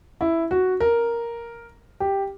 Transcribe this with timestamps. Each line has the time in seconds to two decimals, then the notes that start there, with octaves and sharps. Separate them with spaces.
0.21 E4
0.51 F#4
0.80 A#4
2.00 G4